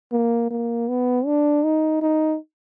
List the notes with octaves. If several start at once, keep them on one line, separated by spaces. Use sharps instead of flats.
A#3
A#3
B3
D4
D#4
D#4